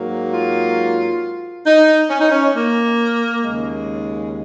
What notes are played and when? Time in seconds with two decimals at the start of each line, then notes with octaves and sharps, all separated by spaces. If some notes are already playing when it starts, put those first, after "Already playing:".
Already playing: G#2 F#3 A#3
0.32 F4
1.66 D#4
2.09 C#4
2.20 D#4
2.31 C#4
2.54 A#3
3.43 D#2 C#3 G#3